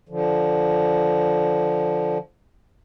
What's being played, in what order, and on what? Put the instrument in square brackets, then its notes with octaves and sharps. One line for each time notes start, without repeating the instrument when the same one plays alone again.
[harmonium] D3 F3